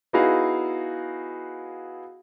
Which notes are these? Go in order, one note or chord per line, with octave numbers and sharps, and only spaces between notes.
B3 D#4 E4 F#4 G#4 F5